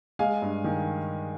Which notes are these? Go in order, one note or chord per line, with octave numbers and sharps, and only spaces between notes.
G#3 F5 G#5
G2
D#3